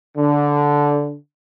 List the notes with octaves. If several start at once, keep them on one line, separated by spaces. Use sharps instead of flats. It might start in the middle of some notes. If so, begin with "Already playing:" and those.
D3